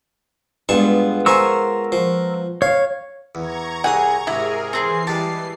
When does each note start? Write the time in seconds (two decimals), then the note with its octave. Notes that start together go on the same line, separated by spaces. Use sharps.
0.69 G2 G#3 B3 F4 A5 C#6
1.26 A#4 C5 G#5 A5 C#6 E6
1.92 F3
2.62 C#5 F5
3.35 E2 A#5 C#6 G#6
3.84 C2 G#4 F#5 G#5 D#6
4.27 G#2 C3 E4 G#4 A#4 A#5
4.73 E3 C4 G#4 G#5 C7
5.07 G3 G#3 G4 A5